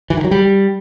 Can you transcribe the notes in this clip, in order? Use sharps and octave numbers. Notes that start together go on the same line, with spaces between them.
E3
D#3
F#3
G3